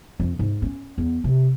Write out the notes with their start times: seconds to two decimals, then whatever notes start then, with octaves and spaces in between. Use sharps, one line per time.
0.20 F2
0.39 G#2
0.62 C#4
0.98 E2
1.24 C3